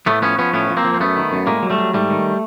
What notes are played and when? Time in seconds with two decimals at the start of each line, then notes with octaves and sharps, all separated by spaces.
0.06 A2 A3 B3
0.22 F3 B3 C#4
0.38 F3 B3 C#4
0.53 A2 B3 C#4
0.70 F3
0.77 A#3 C4
0.84 F3
0.94 C4
1.00 F#2 A3 B3
1.17 D#3
1.32 F#2
1.46 A2 G#3 A#3
1.63 F#3
1.70 G3 A3
1.78 F#3
1.94 G#2 G3 A3
2.10 D#3